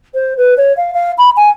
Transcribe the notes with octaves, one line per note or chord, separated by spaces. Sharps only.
C5
B4
C#5
F5
F5
B5
G#5